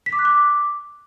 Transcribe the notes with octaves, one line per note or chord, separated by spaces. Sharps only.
B6
D6
F#6
D6